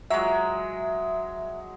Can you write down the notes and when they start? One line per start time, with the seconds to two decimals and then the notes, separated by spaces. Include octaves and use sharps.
0.10 F#3 G#3 E5